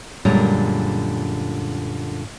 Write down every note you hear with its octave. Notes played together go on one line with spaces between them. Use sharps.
F#2 A#2 D3 G3 G#3